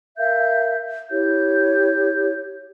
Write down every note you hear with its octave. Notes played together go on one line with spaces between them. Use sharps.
A#4 E5 F5 G6
E4 G4 C#5 G6